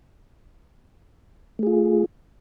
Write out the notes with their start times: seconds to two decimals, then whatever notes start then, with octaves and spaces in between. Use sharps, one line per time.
1.59 A3
1.63 G#4
1.67 F4